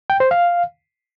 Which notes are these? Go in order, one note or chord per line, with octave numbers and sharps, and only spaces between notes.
G5
C5
F5